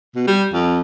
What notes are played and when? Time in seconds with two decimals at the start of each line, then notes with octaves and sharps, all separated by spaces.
0.16 B2
0.27 G3
0.53 F2